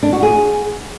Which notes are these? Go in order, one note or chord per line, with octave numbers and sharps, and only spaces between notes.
D4
F#4
G#4